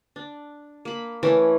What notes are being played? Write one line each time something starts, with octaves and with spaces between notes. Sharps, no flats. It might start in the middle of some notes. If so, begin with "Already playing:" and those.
D4
A#3 B5
E3 A3 C#4 A#4